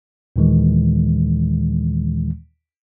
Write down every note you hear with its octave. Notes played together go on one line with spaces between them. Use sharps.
D#2 A#2 D#3 E3 G#3